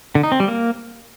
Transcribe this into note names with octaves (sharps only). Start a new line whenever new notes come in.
D3
D#4
C4
G3
A#3